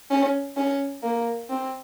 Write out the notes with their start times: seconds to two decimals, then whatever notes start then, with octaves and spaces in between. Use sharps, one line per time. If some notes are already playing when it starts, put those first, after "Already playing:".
0.10 C#4
0.57 C#4
1.03 A#3
1.50 C4